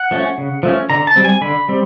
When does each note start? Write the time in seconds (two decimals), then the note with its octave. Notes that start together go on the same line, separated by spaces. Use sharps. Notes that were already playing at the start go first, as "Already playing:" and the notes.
Already playing: F#5
0.11 F3 A3 C#4
0.38 C#3
0.63 F3 A3 C#4
0.90 D3 A#5
1.07 A5
1.16 G3 C4
1.25 G#5
1.41 D3 B5
1.69 G3 C4